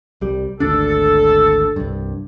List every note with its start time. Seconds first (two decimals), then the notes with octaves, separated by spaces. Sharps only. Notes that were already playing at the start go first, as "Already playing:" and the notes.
0.21 C2 G3
0.60 G#1 D2 D4 A4
1.76 C2 G2